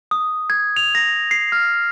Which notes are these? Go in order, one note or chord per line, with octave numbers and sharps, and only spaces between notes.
D#6
G#6
F7
A#6
C7
F6